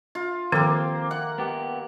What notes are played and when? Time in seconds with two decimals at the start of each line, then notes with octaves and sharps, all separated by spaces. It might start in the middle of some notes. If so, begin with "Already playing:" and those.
0.15 F4
0.52 D#3 F3 A#3 C4 G4 A4
1.11 F#5
1.38 B3 G4